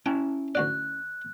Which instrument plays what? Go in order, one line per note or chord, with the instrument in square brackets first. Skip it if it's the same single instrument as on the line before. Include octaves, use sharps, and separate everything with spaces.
[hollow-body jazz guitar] C#4 E4 A5 [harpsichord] G5
[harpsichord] D2 F#4 D5 [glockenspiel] F#6